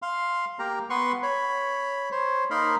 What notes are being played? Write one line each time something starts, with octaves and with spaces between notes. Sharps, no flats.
F5 C6
A#3 G4 A#4 A#5
B3 B4 C6 C#6
C#5 B5
C5 C#5
A#3 D#4 A#4 B5 C6